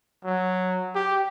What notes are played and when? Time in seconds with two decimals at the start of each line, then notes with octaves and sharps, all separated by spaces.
0.25 F#3
0.95 G4